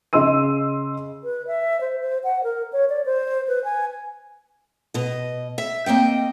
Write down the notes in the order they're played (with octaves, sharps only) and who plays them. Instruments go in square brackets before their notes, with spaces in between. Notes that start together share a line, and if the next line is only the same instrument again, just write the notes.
[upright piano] C#3 D#5 C6 E6 D#7
[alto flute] B4
E5
C5
C5
F#5
A#4
C#5
D5
C5
B4
G#5
[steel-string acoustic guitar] B2 D#5
E5
A#3 C4 D#5 G5